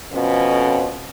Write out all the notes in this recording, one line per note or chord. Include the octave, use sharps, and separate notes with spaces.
F2 B2 C#4